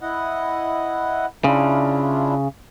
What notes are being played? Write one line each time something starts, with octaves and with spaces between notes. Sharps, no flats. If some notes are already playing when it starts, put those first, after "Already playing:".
E4 D#5 F#5
C#3 D4 E4 F4